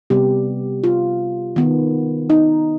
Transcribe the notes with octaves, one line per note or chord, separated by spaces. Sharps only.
C3 G3 B3 G4
F4
D#3 B3
D#4